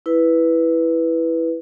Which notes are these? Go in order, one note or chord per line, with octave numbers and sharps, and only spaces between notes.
E4 B4